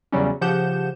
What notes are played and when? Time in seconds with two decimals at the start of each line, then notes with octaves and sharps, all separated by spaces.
0.12 E2 C#3 F#3 G3 C#4
0.41 C#3 F3 G4 F#5 G6 E7